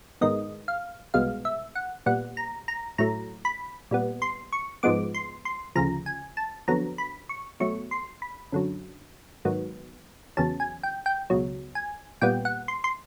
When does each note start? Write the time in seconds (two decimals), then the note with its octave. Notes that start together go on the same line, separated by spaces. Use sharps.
0.21 G#2 D#3 G#3 B3 D#5
0.68 F5
1.14 C2 B2 G#3 B3 F5
1.45 E5
1.75 F#5
2.06 A#2 G3 B3 F#5
2.37 A#5
2.68 A#5
2.98 A2 F#3 A3 A#5
3.45 B5
3.91 A#2 G3 B3
4.22 C6
4.53 C#6
4.83 G#2 F3 G#3 B3 D6
5.14 C6
5.45 C6
5.75 D2 C#3 F3 A#5
6.06 G#5
6.37 A5
6.68 F2 D3 F#3 B3 A#5
6.98 B5
7.29 C#6
7.60 B2 F#3 A3 C#6
7.91 C6
8.22 B5
8.52 F#2 D3 F#3
9.45 G#2 D#3 F#3 B3
10.37 E2 C#3 F#3 A5
10.60 G#5
10.83 G5
11.06 G5
11.30 C#2 B2 F#3
11.75 G#5
12.21 A#2 G3 B3 G5
12.45 F#5
12.68 C6
12.84 C6